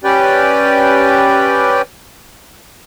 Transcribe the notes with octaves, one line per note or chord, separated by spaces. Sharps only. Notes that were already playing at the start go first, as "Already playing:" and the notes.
C#4 G4 B4 D5 G5